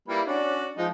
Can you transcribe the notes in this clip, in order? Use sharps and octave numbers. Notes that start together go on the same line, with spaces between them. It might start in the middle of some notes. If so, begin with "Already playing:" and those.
G3 A#3 E4 B4
C#4 D4 F#4 D5
F3 G#3 D#4